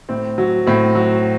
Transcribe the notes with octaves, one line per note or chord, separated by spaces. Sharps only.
A2 C4
F#3
A2 C4
F#3